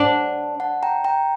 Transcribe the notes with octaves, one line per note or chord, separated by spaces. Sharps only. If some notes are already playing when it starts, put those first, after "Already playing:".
Already playing: D4 F#5 A5
F#5 A5
G5 A#5
G5 A#5